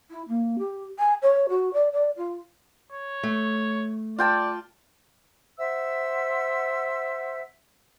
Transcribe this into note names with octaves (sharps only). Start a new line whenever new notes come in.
E4
A#3
G4
G#5
C#5
F#4
D5
D5
F4
C#5
A3
F4 D5 G5 A5
C5 E5 F#5 E6